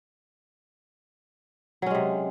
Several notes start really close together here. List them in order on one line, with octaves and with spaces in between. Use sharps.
F#3 C#4 G#3 C3